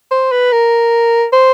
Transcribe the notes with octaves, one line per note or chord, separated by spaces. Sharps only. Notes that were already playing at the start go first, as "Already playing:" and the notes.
C5
B4
A#4
C5